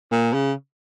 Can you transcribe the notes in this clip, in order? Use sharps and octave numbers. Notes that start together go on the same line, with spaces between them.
A#2
C#3